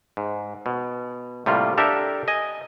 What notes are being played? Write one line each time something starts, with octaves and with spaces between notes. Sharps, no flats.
G#2
B2
A2 C3 G3 A#3 F4
D4 G4 A4 A#4 E5
D#5 G#5